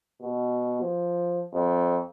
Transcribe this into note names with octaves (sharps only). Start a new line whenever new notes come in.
B2
F3
F2